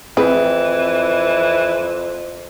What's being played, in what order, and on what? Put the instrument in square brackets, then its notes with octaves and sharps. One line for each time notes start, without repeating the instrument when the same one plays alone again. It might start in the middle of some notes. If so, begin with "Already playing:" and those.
[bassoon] F2 [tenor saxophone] E3 [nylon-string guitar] C4 [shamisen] E4 G#4 B4